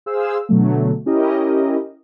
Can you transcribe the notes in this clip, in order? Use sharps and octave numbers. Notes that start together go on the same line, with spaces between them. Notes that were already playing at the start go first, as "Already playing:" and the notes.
G#4 C5 F5 E6
B2 D3 F#3 A3
C#4 E4 G4 A#4 D#5